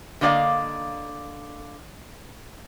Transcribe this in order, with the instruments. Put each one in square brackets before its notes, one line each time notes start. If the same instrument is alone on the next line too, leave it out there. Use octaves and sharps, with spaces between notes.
[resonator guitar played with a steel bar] D3 A3 A#3 D5 D#5 F5